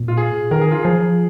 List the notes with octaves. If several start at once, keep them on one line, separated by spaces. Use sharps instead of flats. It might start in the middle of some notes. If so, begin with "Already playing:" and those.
Already playing: A#2
F4
G#4
D#3 A#4
G#4
F4
F3 G#4